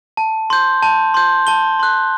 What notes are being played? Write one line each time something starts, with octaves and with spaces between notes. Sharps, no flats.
A5
C6 G6
A5
C6 G6
A5 G7
C6 F#6